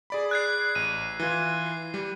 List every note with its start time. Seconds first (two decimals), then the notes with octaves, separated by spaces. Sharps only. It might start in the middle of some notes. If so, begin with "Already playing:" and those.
0.10 G#4 D5 B5
0.31 F#6 G#6 C7
0.75 A1 D#7
1.20 E3 F4
1.66 C7
1.94 G3